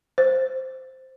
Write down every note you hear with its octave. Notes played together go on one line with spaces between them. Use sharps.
C5